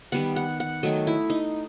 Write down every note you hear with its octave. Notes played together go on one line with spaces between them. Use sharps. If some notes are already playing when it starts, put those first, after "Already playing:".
D#3 G3 B3 F#5
F#5
F#5
D#3 F#3 A3 D#5
E4
D#4